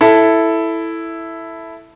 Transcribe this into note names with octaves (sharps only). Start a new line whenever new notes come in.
E4 A4